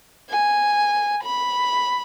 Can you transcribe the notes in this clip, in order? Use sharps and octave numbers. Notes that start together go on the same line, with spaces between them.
G#5
B5